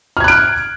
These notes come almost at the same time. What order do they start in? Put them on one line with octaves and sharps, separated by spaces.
F6 G#6 F#6 D7